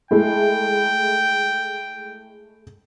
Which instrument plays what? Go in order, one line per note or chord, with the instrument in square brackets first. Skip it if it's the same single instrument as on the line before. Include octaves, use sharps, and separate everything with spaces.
[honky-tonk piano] G#3 A3 E4 [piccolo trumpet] G5